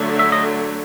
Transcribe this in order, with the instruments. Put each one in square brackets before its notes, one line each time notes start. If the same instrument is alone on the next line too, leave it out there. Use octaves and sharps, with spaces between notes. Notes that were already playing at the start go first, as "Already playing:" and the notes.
Already playing: [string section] D3 F#3 A3
[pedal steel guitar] E5
D#5